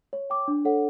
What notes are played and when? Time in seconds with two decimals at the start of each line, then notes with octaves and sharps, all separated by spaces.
0.13 C#5
0.30 G5 D6
0.48 D4
0.65 A4 C#5 F#5